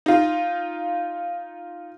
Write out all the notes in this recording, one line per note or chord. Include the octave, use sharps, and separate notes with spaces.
D#4 F4